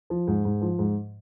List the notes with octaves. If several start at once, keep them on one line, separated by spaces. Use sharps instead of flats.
F3
G#2
G#2
F3
G#2